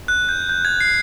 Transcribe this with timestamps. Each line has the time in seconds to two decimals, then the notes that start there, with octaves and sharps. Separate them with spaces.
0.08 F#6
0.29 G6
0.49 G6
0.65 G#6
0.80 C7